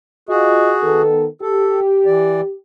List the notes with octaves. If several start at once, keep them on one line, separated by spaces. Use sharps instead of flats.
F4 F#4 G#4 D#5
D#3 B3 A4
G4 A4
E3 D5